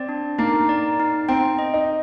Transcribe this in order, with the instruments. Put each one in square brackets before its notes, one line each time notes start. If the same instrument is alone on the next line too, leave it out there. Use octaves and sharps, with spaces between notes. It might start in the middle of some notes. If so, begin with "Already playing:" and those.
Already playing: [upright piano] C4 [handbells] D5
[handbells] D4
[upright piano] A#3 [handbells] D#4
[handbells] D5
D#4
[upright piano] C4 [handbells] G5
[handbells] D#5
[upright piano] D#4